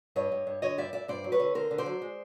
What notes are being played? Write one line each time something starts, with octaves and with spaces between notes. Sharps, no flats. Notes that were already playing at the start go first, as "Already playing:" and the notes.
G2 C#5 D#5
G2
G2
D3 C#5 D#5
G2 D5 E5
G2 D5 E5
G2 C5 D5
F#3
B4 C#5
D3
D3 A#4 C5
D3
C5 D5
F#3
G#3